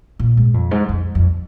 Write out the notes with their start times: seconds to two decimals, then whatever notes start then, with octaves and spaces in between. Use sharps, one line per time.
0.19 A#2
0.37 G#2
0.54 F2
0.71 G#2
0.89 F2
1.15 F2